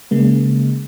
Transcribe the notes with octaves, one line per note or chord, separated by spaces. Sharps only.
C#3 G#3 A#3